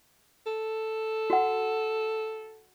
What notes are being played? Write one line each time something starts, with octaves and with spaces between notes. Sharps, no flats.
A4
F#4 F#5